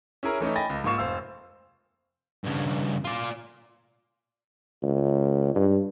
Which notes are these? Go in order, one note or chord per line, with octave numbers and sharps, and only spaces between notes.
C#4 E4 G#4 A#4
E3 A3 C#4 D#4
D#5 G5 G#5 B5 A6 A#6
C#2
G#2 A#3 F4 C#6 E7
F1 C5 F5 E6
G2 C#3
F4 D5
C#2
G2